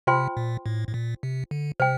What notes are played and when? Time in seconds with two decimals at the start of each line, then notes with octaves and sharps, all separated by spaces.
0.07 C3 F4 C5 G5 C6
0.37 A#2
0.66 A2
0.88 A2
0.94 A#2
1.23 C3
1.51 D3
1.80 C3 C5 G5